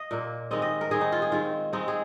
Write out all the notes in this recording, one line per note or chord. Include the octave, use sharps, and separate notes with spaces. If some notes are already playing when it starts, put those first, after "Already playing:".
Already playing: D#5 F5
A#2 A#3
D#3 G#3 C4 D#5
D#5
A#4
D#3 G#3 C4 G#4
D#4
F4
G#4
D#3 G#3 C4 F4
D#3 G#3 C4 D#4
G#4